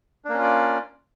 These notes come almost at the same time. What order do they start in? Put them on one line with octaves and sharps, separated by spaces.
D4 A#3 C#4 F4 D5